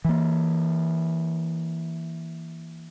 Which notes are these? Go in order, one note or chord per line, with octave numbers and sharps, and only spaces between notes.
E3 A#3